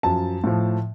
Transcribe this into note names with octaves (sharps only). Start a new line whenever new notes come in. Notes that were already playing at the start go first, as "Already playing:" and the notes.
F#2 F3 A5
A2 F3